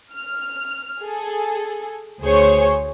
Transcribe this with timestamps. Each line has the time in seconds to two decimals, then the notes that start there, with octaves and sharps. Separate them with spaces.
0.14 F6
1.02 G#4 A4
2.21 D2 G#4 C5 C#5 C#6